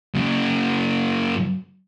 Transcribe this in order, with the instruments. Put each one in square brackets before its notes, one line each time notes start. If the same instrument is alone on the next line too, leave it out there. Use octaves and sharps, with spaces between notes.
[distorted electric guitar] F#2 C#3